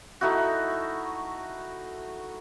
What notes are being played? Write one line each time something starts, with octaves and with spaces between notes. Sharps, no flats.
A3 D#4 E4 F#4